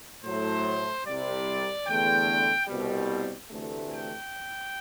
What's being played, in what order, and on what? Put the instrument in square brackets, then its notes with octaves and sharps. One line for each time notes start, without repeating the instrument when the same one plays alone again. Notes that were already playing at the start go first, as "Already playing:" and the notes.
[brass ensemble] A2 F#3 A3 C5
C2 C3 G3 D5
E2 D3 A3 G5
C2 B2 G3
D2 C3 E3 A3
G5